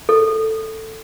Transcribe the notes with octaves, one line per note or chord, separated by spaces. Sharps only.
A4